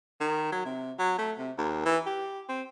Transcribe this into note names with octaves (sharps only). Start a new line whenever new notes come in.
D#3
F#3
C3
F#3
A3
C3
D#2
E3
G4
C4